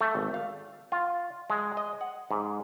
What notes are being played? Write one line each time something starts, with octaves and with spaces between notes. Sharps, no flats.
A3
G#1
F5
F4
G#3
D#5
F#5
G#2